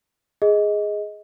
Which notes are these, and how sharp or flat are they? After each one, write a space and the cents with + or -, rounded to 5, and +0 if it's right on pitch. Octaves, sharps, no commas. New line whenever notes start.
G#4 +0 D#5 +15